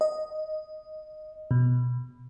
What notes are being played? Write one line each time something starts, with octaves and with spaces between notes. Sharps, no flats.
D#5
B2